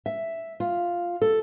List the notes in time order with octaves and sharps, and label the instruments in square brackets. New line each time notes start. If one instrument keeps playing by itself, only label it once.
[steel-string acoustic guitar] E5
F4
A4